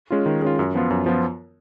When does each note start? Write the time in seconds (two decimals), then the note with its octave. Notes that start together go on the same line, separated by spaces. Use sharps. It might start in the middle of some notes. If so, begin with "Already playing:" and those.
0.10 G#3 C#4 F4
0.26 D#3
0.42 G#3 C#4 F4
0.59 F#2
0.75 F3 B3 F4
0.90 F#2
1.06 F3 B3 F4